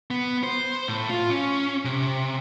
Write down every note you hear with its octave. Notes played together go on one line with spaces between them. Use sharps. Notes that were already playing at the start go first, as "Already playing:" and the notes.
B3
C5
A2
F4
C#4
C3